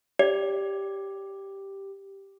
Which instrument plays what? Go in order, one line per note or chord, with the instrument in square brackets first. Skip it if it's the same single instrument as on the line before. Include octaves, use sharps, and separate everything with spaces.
[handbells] G4 [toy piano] D5